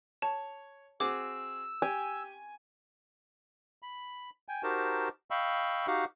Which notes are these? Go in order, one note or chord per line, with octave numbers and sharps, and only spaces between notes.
C#5 A5
C4 F#4 G#4 D6 E6
G4 G#5
B5
G5 G#5
D#4 F#4 G4 A#4 C5 A5
D#5 F5 G5 B5 C#6 E6
D#4 F#4 G4 F5 F#5